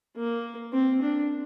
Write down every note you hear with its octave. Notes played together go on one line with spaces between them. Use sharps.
A#3
C4
D4